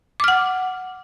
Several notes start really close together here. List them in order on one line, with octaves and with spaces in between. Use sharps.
D6 F6 F#5